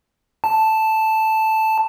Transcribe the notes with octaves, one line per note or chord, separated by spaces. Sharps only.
A5